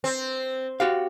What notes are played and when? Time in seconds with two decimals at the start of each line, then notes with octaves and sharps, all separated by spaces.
0.04 C4
0.80 F#4 G4 F5